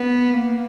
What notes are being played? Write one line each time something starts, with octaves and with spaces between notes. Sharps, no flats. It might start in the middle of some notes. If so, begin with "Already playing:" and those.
Already playing: B3
A#3